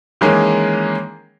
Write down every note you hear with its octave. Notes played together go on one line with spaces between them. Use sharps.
D#3 E3 G#3 A#3 C#4 G#4